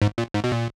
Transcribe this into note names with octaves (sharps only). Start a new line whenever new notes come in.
G#2
A#2
G#2
B2
A#2